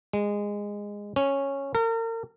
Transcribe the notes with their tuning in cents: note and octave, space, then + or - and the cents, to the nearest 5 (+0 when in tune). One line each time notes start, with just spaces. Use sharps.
G#3 -15
C#4 -5
A#4 -40